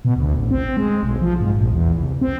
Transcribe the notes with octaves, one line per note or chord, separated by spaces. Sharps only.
B2
D2
A1
C4
G#3
B1
F3
G#2
A#1
E2
C2
C4